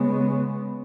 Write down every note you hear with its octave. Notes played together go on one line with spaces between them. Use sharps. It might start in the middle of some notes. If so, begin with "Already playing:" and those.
Already playing: C#3 G#3 B3